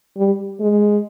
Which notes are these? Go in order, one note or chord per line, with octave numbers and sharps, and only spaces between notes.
G3
G#3